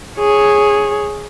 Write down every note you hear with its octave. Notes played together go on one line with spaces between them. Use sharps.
G#4 C#5